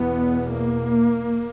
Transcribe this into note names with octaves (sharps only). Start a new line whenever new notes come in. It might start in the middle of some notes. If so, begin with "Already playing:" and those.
Already playing: E2 B2 B3
A#3